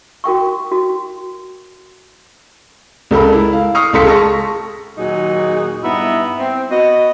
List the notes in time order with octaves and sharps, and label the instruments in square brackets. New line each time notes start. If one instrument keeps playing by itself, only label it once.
[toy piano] F#4 A#4 G5 C#6
F#4
[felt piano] C#2 A4 A#4 B5
E4
F5
C#6 D#6 F6 C7
C#2 A4 F5 C6 B6 C#7
G#4 A5 C#6 A#6
[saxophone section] D#2 A#2 F#3 D#4 F#4 G#4
G2 B3 D#4 E4 E5
C4
B3 F#4 D#5